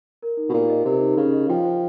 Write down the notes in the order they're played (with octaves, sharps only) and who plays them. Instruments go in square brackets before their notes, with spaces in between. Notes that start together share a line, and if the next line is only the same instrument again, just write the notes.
[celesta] A#4
D#4
[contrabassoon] B2
[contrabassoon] A#2 [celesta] G4
[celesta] D#5
[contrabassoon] C3 [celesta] A#4
[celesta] D#4
[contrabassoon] C#3 [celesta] G4
[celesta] D#5
[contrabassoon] F3 [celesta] G5
[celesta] C5